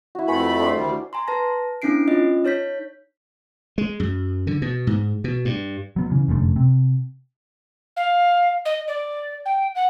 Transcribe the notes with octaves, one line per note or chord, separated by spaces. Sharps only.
E4 F#4
F2 A3 B4 G#5 B5 C#6
D4 C5
D2 D#3 G3
G#5 A#5 C6
B4 A5 A#6
B3 C#4 D4 E4 C7 D7
C#4 F4 D#5
D#4 C#5 G6 B6
G#3
F#2
D3
B2
G#2
B2
G2
F#3 B3
C#3 E3
F1 F#2 D3 A3
C3
F5
D#5
D5
G5
F#5